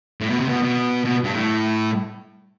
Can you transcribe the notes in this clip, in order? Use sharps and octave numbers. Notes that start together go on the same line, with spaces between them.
A2
B2
C3
B2
B2
B2
G2
A2